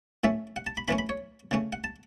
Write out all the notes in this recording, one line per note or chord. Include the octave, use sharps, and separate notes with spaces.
A2 A3 C#4 E5
F#5
A5
B5
A2 E3 A3 C#4 B5
B5
C#5
C#3 A3 C#4
F#5
A5